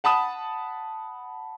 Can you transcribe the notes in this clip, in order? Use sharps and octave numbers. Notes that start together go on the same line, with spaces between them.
F#5 A5 B5 D#6 E7